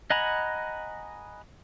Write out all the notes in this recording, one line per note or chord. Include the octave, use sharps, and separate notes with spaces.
D#5 F#5 G#5 A#5 B5